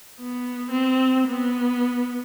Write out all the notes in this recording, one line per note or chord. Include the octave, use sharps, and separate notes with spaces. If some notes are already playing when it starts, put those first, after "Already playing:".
B3
C4
B3